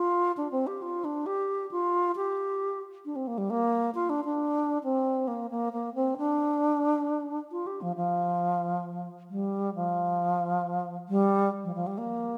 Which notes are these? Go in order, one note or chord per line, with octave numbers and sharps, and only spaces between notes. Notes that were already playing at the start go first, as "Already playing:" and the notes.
Already playing: F4
D4
C4
G4
F4
D4
G4
F4
G4
D4
C4
A#3
G3
A#3
F4
D4
D4
C4
A#3
A#3
A#3
C4
D4
F4
G4
F3
F3
G3
F3
G3
F3
F3
G3
A#3